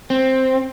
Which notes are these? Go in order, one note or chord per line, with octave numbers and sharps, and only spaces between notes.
C4